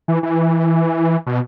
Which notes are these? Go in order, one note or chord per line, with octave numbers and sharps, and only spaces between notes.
E3
E3
B2